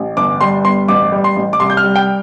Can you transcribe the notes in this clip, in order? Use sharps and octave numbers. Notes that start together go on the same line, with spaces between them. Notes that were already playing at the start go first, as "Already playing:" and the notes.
Already playing: A1
G1 D6
G3 C6
G1 C6
A1 D6
G3
C6
A1
D6
C2 C6
G6
F6
G3
G5